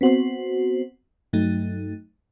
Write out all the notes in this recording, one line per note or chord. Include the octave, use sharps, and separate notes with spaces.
B3 C4 F#4 C5
G2 F#3 A3 D#4